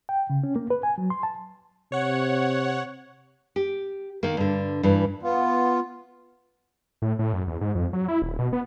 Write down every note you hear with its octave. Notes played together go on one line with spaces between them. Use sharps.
G5
C#3
C#4
A#3
B4
G#5
F#3
C6
A5
C3 C#5 F#5
G4
D#3 A#3
G2 D3
G2 E3
B3 F4
A2
A2
F#2
E2
G#2
F2
F#3
E4
D#1
B2
B3